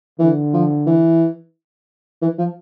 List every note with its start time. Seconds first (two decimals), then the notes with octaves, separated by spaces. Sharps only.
0.19 D3 E3
0.54 F3
0.87 E3
2.22 E3
2.38 F3